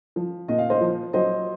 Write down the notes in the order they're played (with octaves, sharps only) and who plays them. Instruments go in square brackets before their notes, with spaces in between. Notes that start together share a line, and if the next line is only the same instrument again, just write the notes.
[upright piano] F3
A#2 D#5
F5
C5 D#5
F3
F#3 C5 D#5